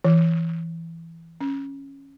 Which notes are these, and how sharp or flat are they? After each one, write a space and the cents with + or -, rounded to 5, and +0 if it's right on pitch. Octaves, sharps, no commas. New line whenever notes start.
E3 +10
C#4 -10